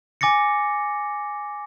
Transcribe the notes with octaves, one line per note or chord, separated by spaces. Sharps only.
G#5 D6 A6 A#6 C#7